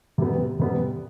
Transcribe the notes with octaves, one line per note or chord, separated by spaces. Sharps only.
C3 G3 B3
C3 G3 B3